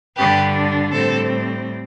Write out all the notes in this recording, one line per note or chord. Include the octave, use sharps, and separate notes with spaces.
G2 D3 G3 D4 G4 B4
A2 G3 C4 A4 C5